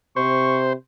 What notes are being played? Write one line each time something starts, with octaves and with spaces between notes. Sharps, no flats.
C3 C5 C#6